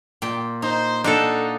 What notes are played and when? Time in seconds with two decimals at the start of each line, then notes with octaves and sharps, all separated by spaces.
0.22 A#2 G5
0.62 D#4 C5
1.04 D4 D#4 A4 D#5 F5 F#5